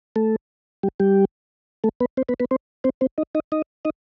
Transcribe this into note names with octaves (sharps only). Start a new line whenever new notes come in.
A3 A4
G3 G4
G3 G4
A3 A4
B3 B4
C4 C5
B3 B4
B3 B4
C4 C5
C4 C5
C4 C5
D#4 D#5
D#4 D#5
D#4 D#5
D#4 D#5